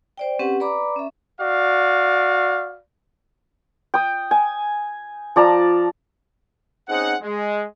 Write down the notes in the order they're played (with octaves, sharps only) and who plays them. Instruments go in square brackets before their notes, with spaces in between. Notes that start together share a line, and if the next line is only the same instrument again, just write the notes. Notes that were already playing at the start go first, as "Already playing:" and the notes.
[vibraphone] C5 D5 G5
C4 C#4 G4 B4 F#5
B4 D5 A#5 B5 D6
C#4 E5
[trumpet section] F#4 D5 F5
[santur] G5 D#6
G#5
F3 D5 A5 A#5
[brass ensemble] C4 C#4 D#4 G#4 C5 F#5
G#3